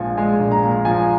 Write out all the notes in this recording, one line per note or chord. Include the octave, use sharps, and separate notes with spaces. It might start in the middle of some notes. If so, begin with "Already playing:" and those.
Already playing: A#1 A#2 F3 G#3 G#5
G#3 G#5
A#1
A#5
A#2
F3 G#5